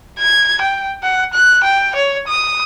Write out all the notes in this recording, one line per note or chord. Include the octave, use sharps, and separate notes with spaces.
G#6
G5
F#5
F#6
G5
C#5
D#6